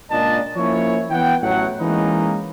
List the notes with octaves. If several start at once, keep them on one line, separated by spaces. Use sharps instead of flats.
C#2 A#2 D4 D#5 A5
F3 A#3 C#4 E4 C#5
E3 B3 F#5 G5
A1 A2 F#3 C#5 F#5
E3 G#3 A#3 C#4 D#4 B4